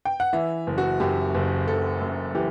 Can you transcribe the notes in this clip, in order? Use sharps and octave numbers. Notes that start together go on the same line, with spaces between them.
G5
F#5
E3 E5
F#1
F#4
F#2 G4
F#1
F#1 A4
F#2
E3 G4